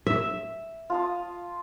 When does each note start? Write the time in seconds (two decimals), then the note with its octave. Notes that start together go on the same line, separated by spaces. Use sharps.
0.07 E5
0.90 F4 A5 D#6